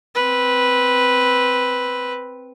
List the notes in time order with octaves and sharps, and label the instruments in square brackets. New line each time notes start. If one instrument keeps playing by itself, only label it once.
[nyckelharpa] C4 B4